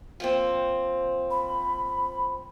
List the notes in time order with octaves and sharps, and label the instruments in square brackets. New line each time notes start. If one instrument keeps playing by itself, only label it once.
[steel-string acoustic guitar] F3 A#3 C4
[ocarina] B5